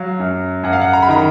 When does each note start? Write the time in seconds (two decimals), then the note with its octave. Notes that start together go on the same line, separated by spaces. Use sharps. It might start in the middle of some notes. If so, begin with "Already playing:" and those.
Already playing: F#3 F5
0.19 F#2
0.63 F#2 F#5
0.73 F5
0.82 F#5
0.93 A#5
1.02 B5
1.09 D#3 A#5